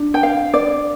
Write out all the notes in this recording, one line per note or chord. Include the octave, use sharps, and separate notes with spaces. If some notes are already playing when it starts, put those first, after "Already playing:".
Already playing: D4
G5
F5
D5